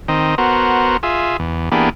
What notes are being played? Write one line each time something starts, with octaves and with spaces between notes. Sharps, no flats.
D#3 C4 D#5
B3 F#4 A#4 C5
F4 G#4 E5
E2
E3 A#3 B3 D4 G4 G#4